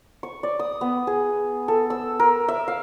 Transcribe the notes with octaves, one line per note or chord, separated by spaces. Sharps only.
C#6
D5
D#6
B3
G#4
A4
E6
A#4
E5
F5